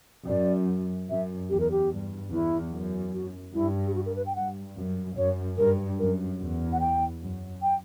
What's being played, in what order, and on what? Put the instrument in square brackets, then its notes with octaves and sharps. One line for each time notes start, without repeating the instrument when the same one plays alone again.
[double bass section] F#2 [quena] D5
[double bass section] F#2 [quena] E5
[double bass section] E2 [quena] G4
[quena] A#4
G4
[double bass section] G2
[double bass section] E2 [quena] E4
[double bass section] F#2
[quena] F#4
[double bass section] G2 [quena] E4
[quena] G4
F#4
A#4
B4
G5
[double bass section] G2 [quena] F#5
[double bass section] F#2
[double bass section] F#2 [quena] C#5
[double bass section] G2 [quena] A#4
[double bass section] F#2 [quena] A#4
[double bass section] E2
[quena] F#5
G5
[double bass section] F#2
[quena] G5